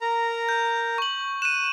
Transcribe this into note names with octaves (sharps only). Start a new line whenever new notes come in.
A#4 A#5
G6
C#6 F#7
F#6 D#7 E7